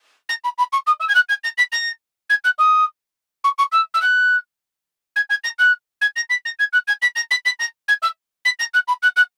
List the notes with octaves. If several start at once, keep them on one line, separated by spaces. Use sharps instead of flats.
A#6
B5
B5
C#6
D#6
E6
G#6
F#6
G#6
A#6
B6
A#6
G#6
F#6
D#6
C#6
C#6
E6
E6
F#6
G#6
G#6
A#6
F#6
G#6
A#6
B6
A#6
G#6
F#6
G#6
B6
A#6
B6
B6
A#6
G#6
E6
B6
A#6
F#6
B5
F#6
F#6